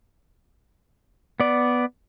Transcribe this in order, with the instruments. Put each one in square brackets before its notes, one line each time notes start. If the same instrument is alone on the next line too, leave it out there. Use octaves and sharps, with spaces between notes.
[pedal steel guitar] B3 D5